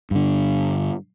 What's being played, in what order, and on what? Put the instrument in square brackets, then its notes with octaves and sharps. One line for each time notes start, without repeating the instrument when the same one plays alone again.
[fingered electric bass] G2 D3